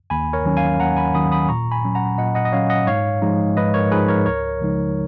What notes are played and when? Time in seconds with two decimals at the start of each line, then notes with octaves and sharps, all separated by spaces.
0.10 D#2 G#5 B5
0.33 A#4 C#5
0.46 D#3 F#3 C#4
0.57 F5 G#5
0.79 D#2 F#5 A#5
0.96 G#5 B5
1.14 D#3 F#3 C#4 B5 D#6
1.32 B5 D#6
1.48 A#2 A#5 C#6
1.72 G#5 B5
1.84 F#3 C#4
1.95 F#5 A#5
2.18 A#2 D#5 F#5
2.35 D#5 F#5
2.45 D#5
2.52 F#3 C#4 C#5 F5
2.70 D#5 F#5
2.87 G#2 C#5 F5
3.22 F3 G#3 D#4
3.57 G#2 B4 D#5
3.74 A#4 C#5
3.91 F3 G#3 D#4 G#4 B4
4.08 A#4 C#5
4.26 C#2 A#4 C#5
4.61 C#3 F3 G#3 D#4